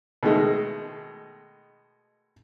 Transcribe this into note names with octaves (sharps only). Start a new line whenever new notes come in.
B2 D#3 G#3 A3